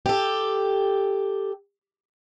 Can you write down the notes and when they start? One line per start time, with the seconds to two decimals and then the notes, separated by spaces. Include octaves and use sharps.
0.06 G4 A4